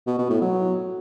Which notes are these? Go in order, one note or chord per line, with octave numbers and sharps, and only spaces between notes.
B2
B2
A2
F#3